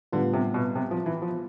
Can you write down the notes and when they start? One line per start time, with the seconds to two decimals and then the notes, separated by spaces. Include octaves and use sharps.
0.12 A2 D3 G3 B3 F4
0.33 C3
0.54 B2
0.75 C3
0.91 F3
1.06 E3
1.22 F3